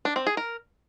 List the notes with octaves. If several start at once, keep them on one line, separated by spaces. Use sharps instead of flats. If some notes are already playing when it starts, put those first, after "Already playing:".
D4
C4
G#4
A#4